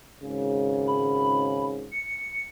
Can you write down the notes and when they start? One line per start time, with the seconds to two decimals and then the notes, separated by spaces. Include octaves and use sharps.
0.23 G#1 G#2 C#3
0.87 B5
1.91 C#7